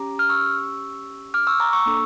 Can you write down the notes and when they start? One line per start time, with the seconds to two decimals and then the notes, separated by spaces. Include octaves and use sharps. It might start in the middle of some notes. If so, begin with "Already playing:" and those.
Already playing: C#4 G4 A#5 D6
0.19 F6
0.29 C#6 E6
1.34 D6 F6
1.47 C#6 E6
1.60 A#5 D6
1.73 C#6 E6
1.86 A#3 D4 A4